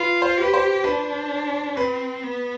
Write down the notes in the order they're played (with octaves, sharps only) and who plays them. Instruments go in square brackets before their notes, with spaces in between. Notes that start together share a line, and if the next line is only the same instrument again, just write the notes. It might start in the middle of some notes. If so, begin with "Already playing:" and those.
Already playing: [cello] F4 [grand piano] B4
[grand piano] C5
[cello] G4 [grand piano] B4
[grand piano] C5
[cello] D4 [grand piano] B4
[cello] C4 [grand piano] B4
[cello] B3